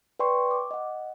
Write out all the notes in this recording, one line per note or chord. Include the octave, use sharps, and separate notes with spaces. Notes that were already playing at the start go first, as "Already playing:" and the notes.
B4 D5 G5 C6 C#6
D6
D#5 F#5